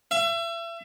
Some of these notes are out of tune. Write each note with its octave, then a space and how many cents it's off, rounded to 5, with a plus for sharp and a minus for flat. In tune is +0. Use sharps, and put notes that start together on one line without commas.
E5 +35